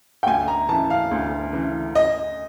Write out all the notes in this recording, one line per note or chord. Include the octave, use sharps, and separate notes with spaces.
G5
D2 G#5
A#5
C#3 E3 A5
F5
D2
C#3 E3
D#5